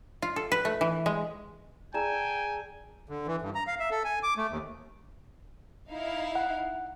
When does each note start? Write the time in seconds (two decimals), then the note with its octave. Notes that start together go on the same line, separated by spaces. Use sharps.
0.22 F4
0.36 A4
0.52 B4
0.65 A3
0.81 E3
1.06 G#3
1.94 G#4 A4 D5 G5 G#5 A#5 E7
3.09 D3
3.27 E3
3.42 G2
3.55 A#5
3.67 F5
3.80 E5
3.91 A4
4.04 G#5
4.23 D6
4.37 A3
4.50 D#2
5.90 D#4 E4 F5
6.35 F#5